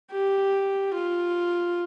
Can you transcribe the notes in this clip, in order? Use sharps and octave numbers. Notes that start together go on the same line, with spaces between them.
G4
F4